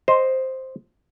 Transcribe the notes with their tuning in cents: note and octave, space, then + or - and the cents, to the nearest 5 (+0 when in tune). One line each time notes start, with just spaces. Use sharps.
C5 +0 D#5 +0